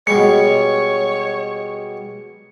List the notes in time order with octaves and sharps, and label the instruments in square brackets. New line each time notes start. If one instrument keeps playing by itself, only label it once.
[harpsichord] B2 G3 G#3 [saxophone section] C#5 [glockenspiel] C#7